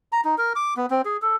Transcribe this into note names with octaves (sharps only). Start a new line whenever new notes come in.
A#5
D#4
A#4
D6
B3
C4
G#4
A4